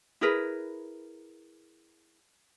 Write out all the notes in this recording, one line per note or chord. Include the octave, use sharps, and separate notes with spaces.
E4 G#4 A#4 B4